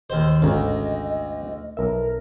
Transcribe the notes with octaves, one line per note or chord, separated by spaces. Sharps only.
D#2 C5 D#5
G#1 D2 C#3 A#5
B1 A#4 E5